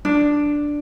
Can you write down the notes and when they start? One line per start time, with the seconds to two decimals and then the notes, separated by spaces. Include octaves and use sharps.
0.05 D4